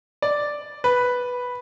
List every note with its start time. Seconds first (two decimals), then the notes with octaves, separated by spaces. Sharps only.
0.22 D5
0.84 B4